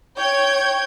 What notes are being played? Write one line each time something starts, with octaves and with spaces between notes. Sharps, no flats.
C#5 G5 G6 G#6